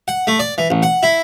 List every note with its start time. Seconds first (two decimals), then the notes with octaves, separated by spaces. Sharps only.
0.08 F#5
0.27 A3
0.39 D5
0.58 E3
0.70 A1
0.83 F#5
1.03 E4